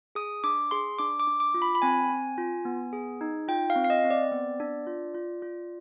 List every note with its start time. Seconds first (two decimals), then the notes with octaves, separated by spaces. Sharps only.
0.15 G#4 D#6
0.44 D4 D6
0.71 G#4 C6
0.99 D4 D6
1.20 D6
1.27 D4
1.40 D6
1.54 F4
1.62 B5
1.75 B5
1.82 C4 G#5
2.10 C4
2.38 F4
2.65 B3
2.93 G#4
3.21 D#4
3.48 F4 G5
3.70 F5
3.76 C4
3.84 F5
3.90 D#5
4.04 C4
4.10 D5
4.32 B3
4.60 D4
4.87 F4
5.14 F4
5.42 F4